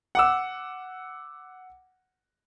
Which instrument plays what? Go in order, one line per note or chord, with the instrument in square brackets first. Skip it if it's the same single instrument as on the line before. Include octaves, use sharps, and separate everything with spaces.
[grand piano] F#5 D6 E6